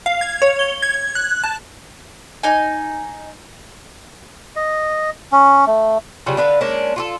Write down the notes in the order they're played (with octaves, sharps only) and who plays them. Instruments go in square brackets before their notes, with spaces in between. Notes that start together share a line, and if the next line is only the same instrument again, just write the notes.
[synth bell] F5
G#6
C#5
G7
G#6
F#6
A5
[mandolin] D#4 G#5
[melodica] D#5
C#4
A3
[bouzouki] C#3 F#3 G3 F4
D3 D4 B4 F5
G#3 A#3 C#4 D4
F4 F#4 A4